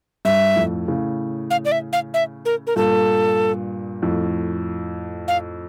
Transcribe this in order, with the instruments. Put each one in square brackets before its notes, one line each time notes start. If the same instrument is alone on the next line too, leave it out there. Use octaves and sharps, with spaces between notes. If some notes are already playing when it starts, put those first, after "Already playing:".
[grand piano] G2 [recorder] E5
[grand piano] F2 A2
A2 C#3
[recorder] F5
D5
E5
F5
E5
A#4
A#4
[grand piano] G2 A#2 [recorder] A4
[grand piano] F2 A2
[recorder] F5